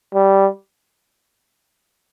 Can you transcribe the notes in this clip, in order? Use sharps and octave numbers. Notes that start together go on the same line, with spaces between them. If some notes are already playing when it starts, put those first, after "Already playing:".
G3